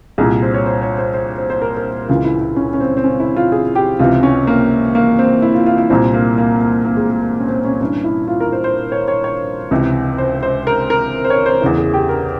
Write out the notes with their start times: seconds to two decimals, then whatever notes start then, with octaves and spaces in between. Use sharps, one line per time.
0.18 C2 A#2 G#4
0.42 C5
0.54 C#5
0.66 C5
0.82 C#5
0.98 C5
1.14 C5
1.38 C5
1.50 C5
1.62 A#4
1.77 A#4
2.08 C#2 C#3 E3 F4
2.25 E4
2.41 E4
2.56 C#4
2.73 C#4
2.80 C4
2.97 C4
3.04 C#4
3.20 E4
3.36 F4
3.52 G#4
3.75 G4
3.99 C#2 C3 E3 F4
4.23 C#4
4.47 A#3
4.95 A#3
5.19 C4
5.42 E4
5.54 F4
5.66 F4
5.78 E4
5.90 C2 A#2 C4
6.14 A#3
6.38 A#3
6.61 A#3
6.85 A#3
6.97 G#3
7.09 G#3
7.21 A#3
7.40 C#4
7.49 C4
7.65 C#4
7.80 G2 E3 C#4
8.04 E4
8.28 F4
8.40 A#4
8.52 C5
8.64 C5
8.92 C#5
9.08 C#5
9.24 C#5
9.71 C#2 C3 E3
10.18 C5
10.43 C5
10.67 A#4
10.90 A#4
11.24 C5
11.30 C#5
11.46 C5
11.61 E2 C#3 E3
11.78 G#4
11.94 G4
12.09 A#4